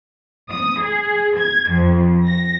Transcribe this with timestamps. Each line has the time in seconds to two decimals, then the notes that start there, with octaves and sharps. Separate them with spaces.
0.50 D#6
0.80 G#4
1.38 G#6
1.70 F2
2.26 A#6